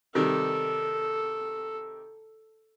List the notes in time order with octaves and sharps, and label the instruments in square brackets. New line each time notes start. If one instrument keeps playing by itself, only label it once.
[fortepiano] C3 D#3 G3 [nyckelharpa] A4